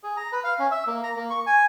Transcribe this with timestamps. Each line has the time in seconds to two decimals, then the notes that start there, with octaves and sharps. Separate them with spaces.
0.03 G#4
0.17 A#5
0.32 B4
0.44 F5
0.59 C#4
0.71 E5
0.87 A#3
1.04 A#5
1.16 A#3
1.30 C#6
1.47 G#5